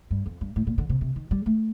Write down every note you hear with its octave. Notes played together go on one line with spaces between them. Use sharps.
G2
F2
G2
A2
A#2
D3
C3
C3
D#3
G3
A3